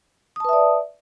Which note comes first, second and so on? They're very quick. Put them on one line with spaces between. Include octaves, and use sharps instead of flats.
D#6 A5 B4 E5 D5